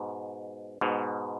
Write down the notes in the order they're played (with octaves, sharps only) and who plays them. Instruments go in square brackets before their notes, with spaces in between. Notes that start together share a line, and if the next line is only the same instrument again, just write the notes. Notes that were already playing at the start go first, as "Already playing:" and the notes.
Already playing: [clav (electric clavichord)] G#2 B2
G#2 B2